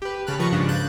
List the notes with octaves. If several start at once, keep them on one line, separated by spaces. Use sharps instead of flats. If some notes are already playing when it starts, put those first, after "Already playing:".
G4 B4
C#3 A5 B5 F6 F#6
D#3 F3 B4 C#6 A#6
G#2 C#3 D4 F4
F#6 G6 A6